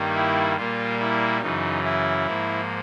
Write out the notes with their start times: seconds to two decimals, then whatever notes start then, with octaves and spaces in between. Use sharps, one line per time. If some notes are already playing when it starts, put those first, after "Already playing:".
Already playing: G2 D#3 G3 A#3
0.14 E4
0.57 A#2 G3 A#3 F4
1.00 E4
1.41 F#2 C#3 E3 D#4
1.84 E4
2.26 G#2 F3 A#3